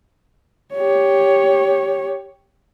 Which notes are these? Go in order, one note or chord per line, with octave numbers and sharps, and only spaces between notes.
G4 C#5